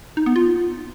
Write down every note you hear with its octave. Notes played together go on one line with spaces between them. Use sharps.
D#4
B3
F4